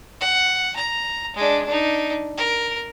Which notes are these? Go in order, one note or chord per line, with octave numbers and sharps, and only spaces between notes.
F#5
A#5
G#3 D4
D4 D#4
A#4